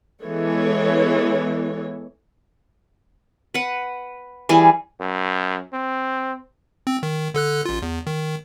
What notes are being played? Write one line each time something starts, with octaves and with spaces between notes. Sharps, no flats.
E3 G#3 B3 A4 C#5
B4 F#5
E3 G3 G#4 G#5
F#2
C4
C4
D#3
D3 A4 F#6
A1 F4
E2
D#3